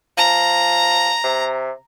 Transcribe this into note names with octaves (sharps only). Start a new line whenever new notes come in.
F3 A#5
C3